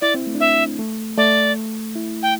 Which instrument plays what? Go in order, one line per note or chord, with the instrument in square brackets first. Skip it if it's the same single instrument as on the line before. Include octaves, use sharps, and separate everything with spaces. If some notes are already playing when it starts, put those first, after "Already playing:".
[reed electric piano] E4 [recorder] D5
[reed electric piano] C4
A3
D4
[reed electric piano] C4 [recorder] E5
[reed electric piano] A3
[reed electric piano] A3 [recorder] D5
[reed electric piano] E4
[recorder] G5